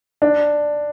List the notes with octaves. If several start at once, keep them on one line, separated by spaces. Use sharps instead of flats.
D4